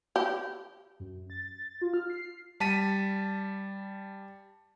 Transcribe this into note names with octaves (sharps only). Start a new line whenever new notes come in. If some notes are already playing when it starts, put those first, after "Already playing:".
G4
F#2
A6
F4
F6
C7
G3 A5 B6 D#7